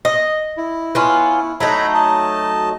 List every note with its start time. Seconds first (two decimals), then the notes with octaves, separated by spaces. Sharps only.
0.05 D#5
0.57 E4
0.95 B3 C#4 F4
1.60 F#3 A3 D#4 E5 A#5 B5
1.94 D#5 A5